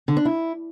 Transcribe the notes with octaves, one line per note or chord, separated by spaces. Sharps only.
D3
D4
E4